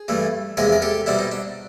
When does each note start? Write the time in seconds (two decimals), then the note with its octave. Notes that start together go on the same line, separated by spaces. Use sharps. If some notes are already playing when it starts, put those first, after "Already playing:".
Already playing: G#4
0.08 G2 E3 A3
0.57 E2 C3 F3 G#3 G#4 A#4
0.72 A#4
0.82 G4 A4
1.06 B2 G3 C4 D4 E4
1.19 D#4
1.31 D4